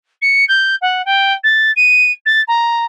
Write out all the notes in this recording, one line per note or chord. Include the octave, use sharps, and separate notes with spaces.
C#7
G6
F#5
G5
A6
D#7
A6
A#5